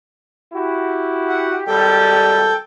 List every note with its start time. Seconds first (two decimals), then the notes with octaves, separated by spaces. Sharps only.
0.53 E4 F#4 G4
1.29 F#5
1.67 G#1 G3 A4 G5